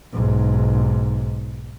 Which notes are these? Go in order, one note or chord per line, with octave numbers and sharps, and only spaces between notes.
B1 G#2